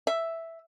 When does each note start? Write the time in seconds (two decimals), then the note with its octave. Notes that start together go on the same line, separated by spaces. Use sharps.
0.07 E5